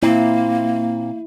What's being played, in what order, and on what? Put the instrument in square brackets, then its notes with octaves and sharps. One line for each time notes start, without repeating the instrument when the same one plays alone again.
[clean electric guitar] A#2 C4 [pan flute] A#3 [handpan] E4